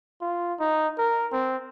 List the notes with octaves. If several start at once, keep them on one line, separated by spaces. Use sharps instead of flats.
F4
D#4
A#4
C4